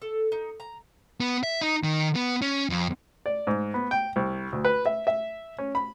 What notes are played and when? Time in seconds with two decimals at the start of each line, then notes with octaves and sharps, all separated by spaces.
0.02 A4
0.32 D#4
0.60 A#5
1.20 B3
1.43 E5
1.61 D#4
1.84 D#3
2.16 B3
2.42 C#4
2.70 F2
3.26 D5
3.47 G#2
3.74 B3
3.91 G5
4.16 C2
4.52 D2
4.65 B4
4.86 E5
5.07 E5
5.58 C#4
5.75 B5